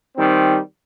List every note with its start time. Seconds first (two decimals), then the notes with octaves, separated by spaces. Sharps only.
0.17 D#3 G3 C4